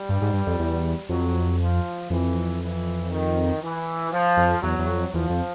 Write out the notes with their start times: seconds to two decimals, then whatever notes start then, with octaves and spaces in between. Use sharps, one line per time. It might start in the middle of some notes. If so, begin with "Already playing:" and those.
Already playing: G3
0.09 G2
0.22 G#2
0.33 G2
0.47 F2
0.59 E2
1.09 F2 F#3
1.60 F3
2.10 F2 E3
2.61 E3
3.11 D#3
3.62 E3
4.12 F3
4.37 F2
4.62 E2 F#3
4.79 E2
4.87 F2
5.13 E2 F3
5.30 F2